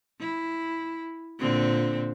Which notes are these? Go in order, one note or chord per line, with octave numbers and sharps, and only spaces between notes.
E4
A#2 D3 C4